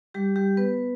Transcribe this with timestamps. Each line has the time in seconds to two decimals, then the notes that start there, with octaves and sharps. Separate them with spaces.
0.14 G3 G4
0.36 G3 G4
0.57 B3 B4